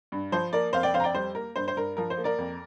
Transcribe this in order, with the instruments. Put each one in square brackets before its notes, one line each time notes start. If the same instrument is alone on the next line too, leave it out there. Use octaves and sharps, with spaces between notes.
[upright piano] G2
F3 C5
A#3 A#4 D5
F2 C5 F5
D5 G5
F2 C5 F5
A#5
D5 G5
G3 C5
A#3 A#4
G2 C5
C5
G2 A#4
F3 A#4
C5
A#3
A#4 D5
F2